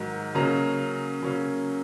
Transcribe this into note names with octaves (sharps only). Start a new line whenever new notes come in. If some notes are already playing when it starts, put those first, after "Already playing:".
Already playing: G#2 D#3 F#3
C#3 F#3 A#3 C#4 A#5
C#3 F#3 A#3 C#4